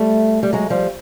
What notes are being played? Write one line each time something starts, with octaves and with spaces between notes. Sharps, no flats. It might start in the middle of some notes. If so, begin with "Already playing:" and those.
Already playing: G3 A3
G3
F#3 G#3
F3 G3